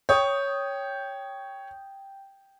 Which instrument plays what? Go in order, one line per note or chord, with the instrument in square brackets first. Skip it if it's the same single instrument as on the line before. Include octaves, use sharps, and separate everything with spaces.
[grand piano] C#5 [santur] G5 D#6